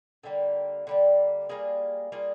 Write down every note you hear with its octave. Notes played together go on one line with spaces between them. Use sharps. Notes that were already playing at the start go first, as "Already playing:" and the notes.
D3 G3 A#3
D3 G3 A#3
G3 A#3 F4 G#4
G3 A#3 F4 G#4